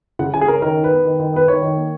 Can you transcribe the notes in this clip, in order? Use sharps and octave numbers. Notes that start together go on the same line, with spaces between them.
C#3 F#5
C#3 G#5
G#4
C#4 A#4
D#3 A#4
D#4
B4
B3
D#3
D#3
B3 B4
D#3 C#5
D#3
A#3